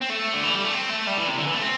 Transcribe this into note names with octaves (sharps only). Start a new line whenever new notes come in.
C4
A3
D3
E3
G3
A3
C4
A3
G3
E3
C3
D3
E3
A3
C4